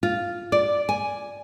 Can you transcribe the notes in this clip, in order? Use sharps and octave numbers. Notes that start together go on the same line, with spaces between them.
F4
D5
G#5